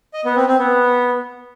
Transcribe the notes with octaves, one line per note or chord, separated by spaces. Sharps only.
D#5
B3
C4
C4
B3